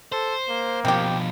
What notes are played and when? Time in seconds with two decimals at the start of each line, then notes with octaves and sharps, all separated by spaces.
0.12 A4 C5
0.49 A#3
0.85 B2 F3 C4 G4